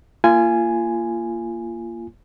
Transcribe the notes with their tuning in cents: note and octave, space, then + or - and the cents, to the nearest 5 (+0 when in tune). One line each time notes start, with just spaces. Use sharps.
A#3 +0 F4 -30 G#5 +0